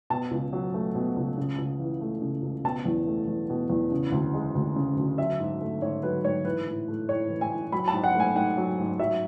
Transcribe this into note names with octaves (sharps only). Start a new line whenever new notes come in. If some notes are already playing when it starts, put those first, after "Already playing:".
B2 A5
C#2
F#3
A3
B2
C#2
C#3
C#2
E3
A3
C#3
C#2
B2 A5
E2
A3
E2
B2
E2
C#3
D2
G#3
D2
C#3
D2
F#3 E5
G#2
A3
G#2 C#5
F#3 B4
G#2 C#5
E3 B4
A2
A3
A2 C#5
E3
G#5
A2
F#3 B5
A5
G#2
F#5
A3 G#5
G#2 F#5
F#3
G#2
F#3 E5